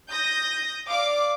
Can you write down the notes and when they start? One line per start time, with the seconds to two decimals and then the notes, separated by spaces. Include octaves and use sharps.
0.11 D#6 G6 A#6
0.89 D5 F5 D6